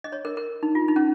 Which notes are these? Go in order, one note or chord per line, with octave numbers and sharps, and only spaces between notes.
D#5
C#5
A#4
A#4
D#4
F4
D#4
C#4